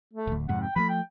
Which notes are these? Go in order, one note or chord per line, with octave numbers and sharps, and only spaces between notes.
A3
D1 D2
F2 G#2 C3 F#5
G5
F3 F#3 A3 B5
G5